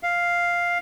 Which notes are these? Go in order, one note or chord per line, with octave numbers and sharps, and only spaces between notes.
F5